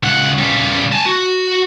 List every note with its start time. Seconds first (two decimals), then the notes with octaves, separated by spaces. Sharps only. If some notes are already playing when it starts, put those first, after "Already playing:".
0.03 C#2 F#5
0.38 C#3 G3
0.92 G#5 A5
1.06 F#4